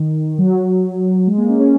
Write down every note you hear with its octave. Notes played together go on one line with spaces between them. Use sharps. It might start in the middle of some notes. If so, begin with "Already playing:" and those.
Already playing: D#3
F#3
G#3
A#3
C#4
C#4